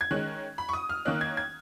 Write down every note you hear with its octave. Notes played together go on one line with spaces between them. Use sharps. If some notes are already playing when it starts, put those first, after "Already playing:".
G#6
D#3 G#3 C#4 F#6
B5
C#6
D#6
F6
D#3 A#3 C#4 F#6
G#6
G#6